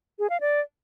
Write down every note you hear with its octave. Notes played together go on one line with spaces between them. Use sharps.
G#4
F5
D5